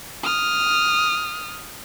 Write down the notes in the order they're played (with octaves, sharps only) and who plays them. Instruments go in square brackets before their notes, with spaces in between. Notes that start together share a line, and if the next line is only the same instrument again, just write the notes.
[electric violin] D#6 F6